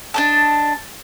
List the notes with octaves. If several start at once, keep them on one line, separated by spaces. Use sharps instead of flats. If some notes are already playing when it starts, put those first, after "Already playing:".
D4 D#5 A5